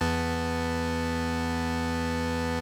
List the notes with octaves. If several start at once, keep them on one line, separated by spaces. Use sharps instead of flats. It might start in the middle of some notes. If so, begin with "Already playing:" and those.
E2 B3 A5